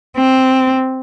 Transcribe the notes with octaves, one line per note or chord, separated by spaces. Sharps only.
C4